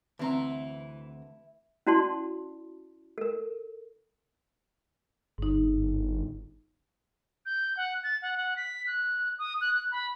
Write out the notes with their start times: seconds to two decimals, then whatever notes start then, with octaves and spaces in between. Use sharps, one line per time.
0.19 D2 E3 C4 A#5
1.87 C#4 E4 F#4 D5 A5 C6
3.18 A4 A#4
5.38 G1 G#2 D#4
7.46 G6
7.77 F#5
8.03 A6
8.22 F#5
8.37 F#5
8.56 B6
8.86 F#6
9.38 D#6
9.61 F#6
9.74 F#6
9.91 B5